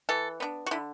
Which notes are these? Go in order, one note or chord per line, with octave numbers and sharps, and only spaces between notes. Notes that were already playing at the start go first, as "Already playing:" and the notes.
E3 A4
B3 D4
F#4
D3 E4